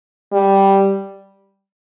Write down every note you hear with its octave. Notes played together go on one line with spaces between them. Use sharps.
G3